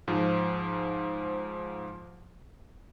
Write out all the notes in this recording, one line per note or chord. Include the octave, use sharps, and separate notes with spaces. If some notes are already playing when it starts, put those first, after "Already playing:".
G#2 F3